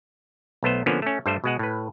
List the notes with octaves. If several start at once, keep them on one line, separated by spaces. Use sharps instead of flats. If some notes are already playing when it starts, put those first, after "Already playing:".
B1 A3 B3 C5
D3 F3 A#3 B3 C#4
A3 C#4
G2 G3 A3 C5
B2 G#3 F#5
A2 B4